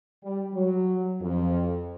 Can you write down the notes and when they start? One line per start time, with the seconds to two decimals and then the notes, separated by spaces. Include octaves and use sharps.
0.23 G3
0.54 F#3
1.21 F2